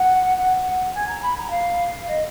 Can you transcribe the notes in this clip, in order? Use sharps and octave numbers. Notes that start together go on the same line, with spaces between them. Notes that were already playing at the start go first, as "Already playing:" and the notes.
Already playing: F#5
F#5
G#5
A#5
B5
A#5
F5
D#5